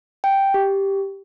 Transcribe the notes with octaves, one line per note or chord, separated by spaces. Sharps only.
G5
G4